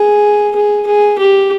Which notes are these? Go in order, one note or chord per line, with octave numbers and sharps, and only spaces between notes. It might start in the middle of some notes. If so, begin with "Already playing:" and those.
Already playing: G#4
G#4
G#4
G4